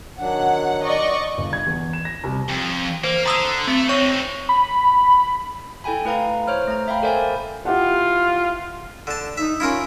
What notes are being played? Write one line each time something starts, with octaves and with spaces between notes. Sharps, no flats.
D#3 F#3 D4 F#5
D5 D#5 C#6
G1
G#6
E2
E7
A#6
C2
F2
A#3 C5
D3 A#5 D#6 E6
A3 C4 C#7
C4 D#4 C#5 C#6
B5
E4 A4 G5 G#5 B5
A3 E4 B4 F5 A#5
C5 C#5 F6
A3 A#5
E5 F5 G5 B5
A4 A#4 C5 D5 E5 G#5
E4 F4 G4 F#5
D3 A5
D#4 E5
C#4 E4 F4 A#4